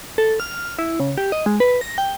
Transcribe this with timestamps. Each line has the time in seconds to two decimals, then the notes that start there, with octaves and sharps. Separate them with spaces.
0.18 A4
0.40 F6
0.79 E4
1.00 C#3
1.17 G4
1.32 D#5
1.46 G#3
1.60 B4
1.81 A#6
1.98 G5